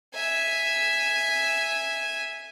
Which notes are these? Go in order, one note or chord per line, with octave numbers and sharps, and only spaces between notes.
E5 G#5